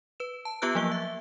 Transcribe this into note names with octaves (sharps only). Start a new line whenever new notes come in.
B4 E7
A5
B3 F4 G4 B4 E6 F#6
F3 F#3 A#3 E6 G7
E5